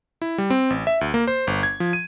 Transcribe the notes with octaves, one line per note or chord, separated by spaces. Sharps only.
E4
G3
C4
A1
E5
D2
A#3
C5
G1
G#6
F3
D#7